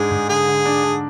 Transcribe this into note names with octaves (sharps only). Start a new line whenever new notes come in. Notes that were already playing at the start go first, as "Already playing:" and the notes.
Already playing: G#2 G#3 D4 G#4
G#2
D3 G#4
D3
D4
D4